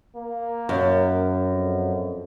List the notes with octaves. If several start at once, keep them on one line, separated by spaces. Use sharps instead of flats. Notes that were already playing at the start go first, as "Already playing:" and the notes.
A#3
F#2
F2